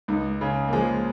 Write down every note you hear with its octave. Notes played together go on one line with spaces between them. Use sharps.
C#2 D#4
C#3
A#3
F3 G#3